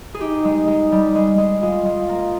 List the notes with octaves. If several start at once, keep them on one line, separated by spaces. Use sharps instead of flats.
G#4
D#4 G4
G#3
G#3
G3
G#3
G#3
G#3 F4
G#3
A#3